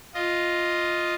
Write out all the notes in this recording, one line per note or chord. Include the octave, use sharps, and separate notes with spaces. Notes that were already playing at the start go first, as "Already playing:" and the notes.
F4 D#5